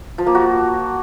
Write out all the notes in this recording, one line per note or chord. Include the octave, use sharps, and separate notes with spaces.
F3
A#3
F#4